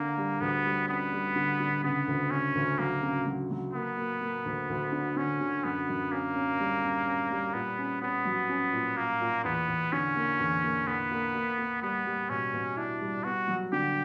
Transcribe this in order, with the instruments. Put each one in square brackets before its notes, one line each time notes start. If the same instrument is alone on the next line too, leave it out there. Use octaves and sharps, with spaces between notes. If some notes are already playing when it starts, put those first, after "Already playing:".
Already playing: [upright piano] D3 [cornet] A#3
[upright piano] G3
[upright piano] D2 [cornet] B3
[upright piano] G3
[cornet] B3 [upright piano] C#4
[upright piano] G3
D3
D3
[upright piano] C#3 [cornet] B3
[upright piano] D2
[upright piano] C#3 [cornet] C#4
[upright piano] D2
[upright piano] F#3 [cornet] A#3
[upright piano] C#3
F#3
F#3
[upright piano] A#3 [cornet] B3
[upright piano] A#3
A#3
D2
D2
D3
[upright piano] D3 [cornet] C#4
[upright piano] D3
[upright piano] F#2 [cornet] B3
[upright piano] F#2
[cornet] A#3 [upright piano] C#4
[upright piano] C#4
G3
C#4
C#4
G3
[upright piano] A#2 [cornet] B3
[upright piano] C#4
[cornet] B3 [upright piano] C#4
[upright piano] F#3
C#4
A#2
[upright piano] A#2 [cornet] A#3
[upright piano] A#2
[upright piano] E2 [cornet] B3
[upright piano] E2
[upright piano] D3 [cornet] C#4
[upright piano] A#3
E2
A#3
[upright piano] A#3 [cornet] B3
[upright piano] A#3
A#3
A#3
[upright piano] G3 [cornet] B3
[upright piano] G3
[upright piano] B2 [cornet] C#4
[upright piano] B2
[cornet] D4 [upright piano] E4
[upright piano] G3
[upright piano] B3 [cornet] F#4
[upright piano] F#3
[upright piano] D3 [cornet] G4